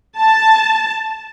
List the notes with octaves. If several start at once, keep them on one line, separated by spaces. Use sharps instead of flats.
A5